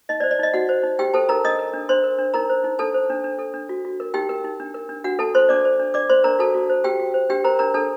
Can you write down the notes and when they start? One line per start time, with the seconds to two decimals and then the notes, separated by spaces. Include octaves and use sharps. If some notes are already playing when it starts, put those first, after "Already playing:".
0.09 D#4 D#5
0.20 D5
0.23 C5
0.31 D5
0.39 D#4 D#5
0.54 D#4 F#4 F#5
0.69 C5
0.83 D#4
0.99 D#4 G4 G5
1.14 A4 C5 A5
1.29 D#4 A#4 A#5
1.44 D4 D#5 D#6
1.59 A#4
1.74 D4
1.89 D4 C5 C6
2.04 A#4
2.19 D4
2.34 D#4 A#4 A#5
2.49 C5
2.64 D#4
2.79 D4 A4 A5
2.94 C5
3.10 D4
3.24 D4
3.39 A4
3.54 D4
3.69 F#4
3.85 F#4
4.00 A#4
4.14 D#4 G4 G5
4.29 A#4
4.44 D#4
4.60 D4
4.74 A#4
4.89 D4
5.04 D4 F#4 F#5
5.19 A4 A5
5.34 C5 C6
5.49 D4 D5 D6
5.65 C5
5.79 D4
5.94 D4 D5 D6
6.09 C5 C6
6.24 D4 A#4 A#5
6.39 F#4 A4 A5
6.54 F#4
6.69 C5
6.84 F#4 G4 G5
6.99 F#4
7.14 C5
7.30 D4 G4 G5
7.44 A#4 C5 A#5
7.59 D4 A#4 A#5
7.74 D4 A4 A5